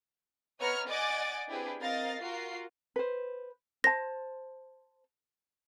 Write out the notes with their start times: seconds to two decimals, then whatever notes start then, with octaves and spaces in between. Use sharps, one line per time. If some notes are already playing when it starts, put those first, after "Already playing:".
0.60 B3 C#5 D#5 A#5 F6 C#7
0.90 D5 D#5 F#5 G#5 D6 A6
1.48 C4 D4 E4 G4 G#4 B4
1.79 C4 A#4 D#5 F5 A6 A#6
2.20 F4 F#4 A#4 C7
2.96 B4 C5
3.84 C5 A5 A#6